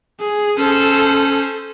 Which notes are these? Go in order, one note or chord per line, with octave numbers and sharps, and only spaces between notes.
G#4
C#4 A4 C5